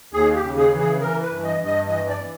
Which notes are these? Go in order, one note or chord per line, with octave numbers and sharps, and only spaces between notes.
D#2 G#4
G4
C#3
G#4
E3
G#4
E3 A#4
B4
G2
D#5
G2
D#5
E3 D#5
D5
E3